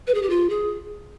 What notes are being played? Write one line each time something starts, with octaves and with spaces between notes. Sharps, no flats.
B4
G#4
G4
F4
G#4